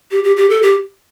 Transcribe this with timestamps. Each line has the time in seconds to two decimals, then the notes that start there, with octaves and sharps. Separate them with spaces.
0.11 G4
0.24 G4
0.37 G4
0.50 A4
0.62 G4